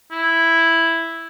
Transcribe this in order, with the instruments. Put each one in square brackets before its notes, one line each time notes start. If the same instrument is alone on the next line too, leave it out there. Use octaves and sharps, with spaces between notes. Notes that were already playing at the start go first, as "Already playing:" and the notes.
[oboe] E4